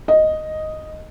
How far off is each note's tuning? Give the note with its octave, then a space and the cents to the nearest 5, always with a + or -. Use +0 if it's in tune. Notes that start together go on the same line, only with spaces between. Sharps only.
D#5 +0